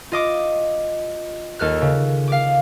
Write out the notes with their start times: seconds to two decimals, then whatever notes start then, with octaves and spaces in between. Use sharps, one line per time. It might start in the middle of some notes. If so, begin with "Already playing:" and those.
0.12 F4 D#5 D6
1.59 D#2 A4 F6 F#6
1.82 C#3
2.28 F5 D6